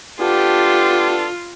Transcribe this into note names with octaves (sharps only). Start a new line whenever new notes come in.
B3 D4 F4 G4 A4